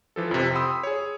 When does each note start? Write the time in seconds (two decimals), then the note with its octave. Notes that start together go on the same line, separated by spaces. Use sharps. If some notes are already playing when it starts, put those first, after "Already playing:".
0.16 E3 F3 A4
0.31 F2 C3
0.55 G5 B5 C6 D#6 E6
0.83 G#4 C#5